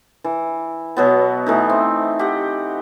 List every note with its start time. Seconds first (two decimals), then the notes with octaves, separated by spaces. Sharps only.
0.24 E3
0.97 B2 F#3 B3
1.46 E3 A3 D#4
1.70 C4
2.19 G4 F#5